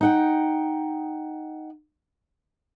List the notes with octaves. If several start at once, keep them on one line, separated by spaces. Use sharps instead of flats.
D#4 F#5 G5